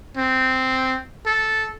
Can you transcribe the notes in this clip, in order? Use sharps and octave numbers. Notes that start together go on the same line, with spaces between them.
C4
A4